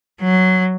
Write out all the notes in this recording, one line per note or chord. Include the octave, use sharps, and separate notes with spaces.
F#3